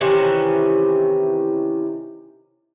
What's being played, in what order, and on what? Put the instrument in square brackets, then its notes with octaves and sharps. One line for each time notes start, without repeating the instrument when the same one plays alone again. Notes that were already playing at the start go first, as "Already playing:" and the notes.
[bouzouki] C3 D#3 E3 C#4